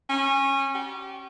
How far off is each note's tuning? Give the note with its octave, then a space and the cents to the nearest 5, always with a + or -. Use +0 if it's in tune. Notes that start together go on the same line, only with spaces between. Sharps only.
C#4 -20
G4 -30